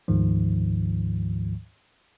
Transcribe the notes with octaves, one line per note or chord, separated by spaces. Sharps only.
D2 G#2 D#3 F3